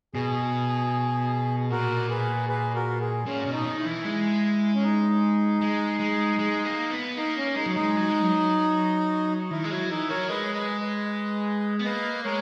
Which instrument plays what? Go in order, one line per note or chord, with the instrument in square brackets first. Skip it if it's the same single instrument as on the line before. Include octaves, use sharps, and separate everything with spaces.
[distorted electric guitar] B2 [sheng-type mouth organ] G#4
[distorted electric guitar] A#2 [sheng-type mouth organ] F#4 A#4
[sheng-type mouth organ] G#4 B4
G#4 B4
F#4 A#4
G#4
[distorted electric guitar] A#2 [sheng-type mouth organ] C#4
[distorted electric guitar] B2
[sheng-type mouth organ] D#4
[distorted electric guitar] D#3
[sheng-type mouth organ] E4
[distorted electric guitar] E3
G#3
[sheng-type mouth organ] C#4
D#4
[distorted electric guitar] G#3
G#3
G#3
A#3
B3
[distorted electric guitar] A#3 [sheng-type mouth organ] D#4
[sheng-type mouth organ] C#4
[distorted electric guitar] G#3 [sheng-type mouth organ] D#4
[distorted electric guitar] F#3
[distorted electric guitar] G#3 [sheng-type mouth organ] D#4
[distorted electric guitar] F#3
G#3
F#3
[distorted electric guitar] D#3 [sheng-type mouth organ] E4
[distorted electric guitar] G#3
[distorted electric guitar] F#3 [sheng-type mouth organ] E4
[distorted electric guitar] E3 [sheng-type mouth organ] D#4
[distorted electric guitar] F#3 [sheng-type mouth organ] A#4 C#5
[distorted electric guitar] G#3 [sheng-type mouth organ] B4 D#5
[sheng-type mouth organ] B4 D#5
B4 D#5
[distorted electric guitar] B3
[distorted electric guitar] A#3 [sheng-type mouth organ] B4 D#5
[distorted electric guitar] G#3 [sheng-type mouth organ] A#4 C#5